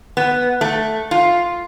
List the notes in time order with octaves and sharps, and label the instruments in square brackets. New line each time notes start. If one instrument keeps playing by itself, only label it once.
[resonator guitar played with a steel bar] B3
A3
F4